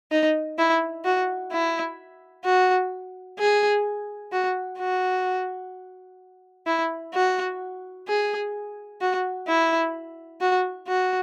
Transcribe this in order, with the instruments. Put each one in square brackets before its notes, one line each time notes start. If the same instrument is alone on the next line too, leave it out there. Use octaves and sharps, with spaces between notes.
[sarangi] D#4
E4
F#4
E4
F#4
G#4
F#4
F#4
E4
F#4
G#4
F#4
E4
F#4
F#4